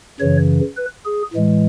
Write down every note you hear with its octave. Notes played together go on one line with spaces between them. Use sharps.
F#2 C#3 E3 C#5
B4
G#4
A2 E3 G#3